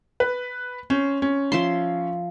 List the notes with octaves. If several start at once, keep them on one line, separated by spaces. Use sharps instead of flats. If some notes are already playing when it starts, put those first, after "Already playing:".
B4
C#4 C5
C#4
F3 E5 C6